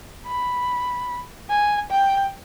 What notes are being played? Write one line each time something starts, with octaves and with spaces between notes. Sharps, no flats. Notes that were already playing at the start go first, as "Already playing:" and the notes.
B5
G#5
G5